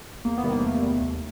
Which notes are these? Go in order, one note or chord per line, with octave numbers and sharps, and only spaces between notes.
E2 A#3
B3
C3 D#3 G3
A#3
A3
E2
A3
C3 D#3 G3
D#2